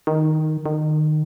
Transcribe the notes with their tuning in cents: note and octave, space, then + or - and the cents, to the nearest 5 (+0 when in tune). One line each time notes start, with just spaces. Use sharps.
D#3 +0
D#3 -25